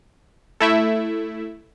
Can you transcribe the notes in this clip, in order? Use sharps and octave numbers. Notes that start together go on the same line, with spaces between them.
A3 E4 E5